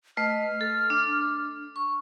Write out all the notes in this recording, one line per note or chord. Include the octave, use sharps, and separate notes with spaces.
A3 B4 D#5 F6
A4
D4
C#6